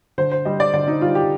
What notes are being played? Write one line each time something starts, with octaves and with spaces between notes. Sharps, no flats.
D3 C5
C5
G3 D#5
D5
D3 D5
D#4
G3 F4
G4